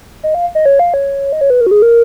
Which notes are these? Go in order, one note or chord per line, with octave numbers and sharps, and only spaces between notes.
D#5
F5
D#5
C#5
F5
C#5
D#5
C#5
B4
A#4
F#4
G#4
A#4